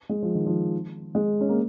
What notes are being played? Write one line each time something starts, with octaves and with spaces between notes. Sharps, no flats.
G#3
F3
D#3
F3
G#3
C#4
A#3